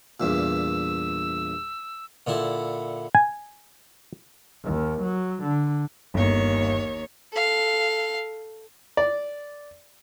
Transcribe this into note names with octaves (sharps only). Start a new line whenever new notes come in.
E2 G2 A#2 E6
A#2 D3 E4
G#5
D#2
F#3
D3
G1 D#2 C#5
A4 F5
D5